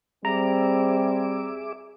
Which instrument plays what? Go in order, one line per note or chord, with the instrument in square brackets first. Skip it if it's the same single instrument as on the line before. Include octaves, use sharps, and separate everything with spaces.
[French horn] G3 [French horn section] C4 [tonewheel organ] G#4 E5 D6 [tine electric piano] A#5